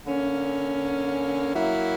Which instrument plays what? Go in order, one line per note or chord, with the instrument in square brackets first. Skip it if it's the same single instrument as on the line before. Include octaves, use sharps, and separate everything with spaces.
[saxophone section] D3 A#3 C#4
F#3 A#3 E4